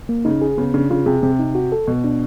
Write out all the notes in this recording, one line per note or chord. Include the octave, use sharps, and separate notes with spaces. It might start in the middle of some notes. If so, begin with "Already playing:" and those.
A#3
C#3 D#4
G#4
C#3 B3
C#3 D4
C#3 F4
C3 G#4
C3 C4
D#4
F#4
A4
B2 B3
D4